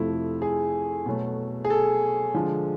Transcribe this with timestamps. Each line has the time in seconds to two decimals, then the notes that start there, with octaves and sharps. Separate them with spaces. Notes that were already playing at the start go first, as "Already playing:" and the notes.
Already playing: F2 C3 F3 A3 E4
0.42 G#4
1.06 B2 F#3 A3
1.65 G#4
1.70 A4
2.34 D3 F3 G#3